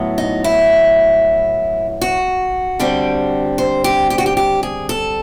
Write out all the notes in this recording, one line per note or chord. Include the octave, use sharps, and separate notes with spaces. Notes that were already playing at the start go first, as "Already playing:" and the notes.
Already playing: A2 F#3 B3
D#4
E4
F#4
D3 G3 C4
C5
G4
G4
F#4
G4
G4
G#4
A4